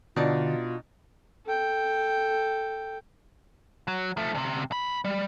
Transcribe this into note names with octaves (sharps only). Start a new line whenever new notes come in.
B2 D3 D4 D#4 F4 D5
A4 G5
F#3
F3 A3
D2 C3
B1 B5
G3